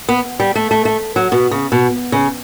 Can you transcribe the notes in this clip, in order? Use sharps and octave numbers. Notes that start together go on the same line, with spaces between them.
B3
G3
A3
A3
A3
F#3
B2
C#3
B2
C#3